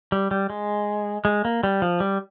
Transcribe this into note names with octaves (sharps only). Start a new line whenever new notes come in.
G3
G3
G#3
G#3
A#3
G3
F3
G3